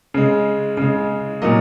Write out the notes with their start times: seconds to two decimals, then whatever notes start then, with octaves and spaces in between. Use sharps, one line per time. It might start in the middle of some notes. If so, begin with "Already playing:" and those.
0.14 C#3 G#3
0.77 C#3 G#3
1.42 A#2 F#3 A#3 D#5